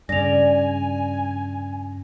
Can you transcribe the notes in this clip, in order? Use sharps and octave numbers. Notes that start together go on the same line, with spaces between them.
G2 C#3 D5 G#5 A#6 F7